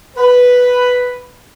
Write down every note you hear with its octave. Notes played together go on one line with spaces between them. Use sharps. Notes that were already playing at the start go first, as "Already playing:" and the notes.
B4